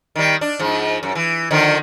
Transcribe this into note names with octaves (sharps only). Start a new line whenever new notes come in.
D#3 G3
D4
G#2 F3
F#2
E3
D3 D#3 F3